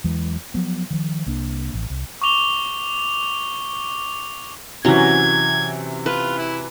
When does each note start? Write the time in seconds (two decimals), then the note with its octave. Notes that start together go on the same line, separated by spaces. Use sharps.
0.04 E2 E3 F#3 G#3
0.54 F3 F#3 B3
0.91 D#3 F3
1.26 C2 A#3 D4
1.74 A1
1.90 C2
2.21 C#6 D6 F7 G7
4.85 C3 E3 F#3 C#4 G#6
6.06 F4 B4
6.38 E4